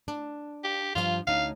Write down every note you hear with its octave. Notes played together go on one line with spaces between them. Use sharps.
D4
G4
G2 F3 F4 F5
D2 C#4 D#4 F5